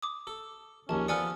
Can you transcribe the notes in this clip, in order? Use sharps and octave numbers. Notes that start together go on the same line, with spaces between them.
D6 D#6
A4
A#1 D#2 C#4 A5
F3 B3 A4 D5 G#5 C#6 F6